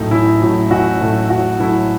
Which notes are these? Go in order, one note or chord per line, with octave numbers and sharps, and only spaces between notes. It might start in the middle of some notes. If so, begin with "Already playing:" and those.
Already playing: A1 A2 F#3 A3 D#4
A1 E4
A2 F#3 A3
A1 F#4
A2 F#3 A3
A1 F#4
A2 F#3 A3 E4